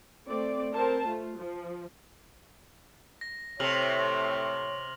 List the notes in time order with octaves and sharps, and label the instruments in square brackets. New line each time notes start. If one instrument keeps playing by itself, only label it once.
[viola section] A3 C4 D5
C4 A#4 C5 A5
A3 F4
F3
[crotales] A#6
[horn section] A2 A3 C4 [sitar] C3 [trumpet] C#5 [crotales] F6 F7 F#7